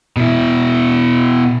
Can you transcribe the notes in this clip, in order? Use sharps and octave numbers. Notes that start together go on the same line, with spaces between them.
B2 E4